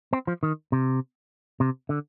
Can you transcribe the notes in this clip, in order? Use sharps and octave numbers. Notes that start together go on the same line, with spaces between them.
C4
F3
D#3
C3
C3
D3